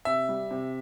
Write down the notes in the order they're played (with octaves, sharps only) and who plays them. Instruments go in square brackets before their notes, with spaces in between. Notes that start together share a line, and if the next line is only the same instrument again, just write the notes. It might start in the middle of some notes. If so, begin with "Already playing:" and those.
[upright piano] C3 [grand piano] E5
[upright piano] G3
C3